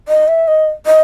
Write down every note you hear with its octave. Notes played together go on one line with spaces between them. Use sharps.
D#5
E5
D#5
D#5